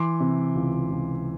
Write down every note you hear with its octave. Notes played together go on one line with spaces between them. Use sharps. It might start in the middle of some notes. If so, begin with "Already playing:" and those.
Already playing: E3 C6 D6
C3
C#2
C#2